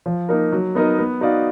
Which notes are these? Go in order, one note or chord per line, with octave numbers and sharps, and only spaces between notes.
F3
A#3 D#4 A#4
F#3
B3 D#4 A#4 D#5
B3
D#4 F#4 D5 F5